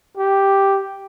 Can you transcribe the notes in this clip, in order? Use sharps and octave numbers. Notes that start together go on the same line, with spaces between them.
G4